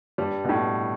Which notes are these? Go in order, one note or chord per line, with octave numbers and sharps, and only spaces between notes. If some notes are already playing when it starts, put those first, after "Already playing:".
G2 G3
B2
A2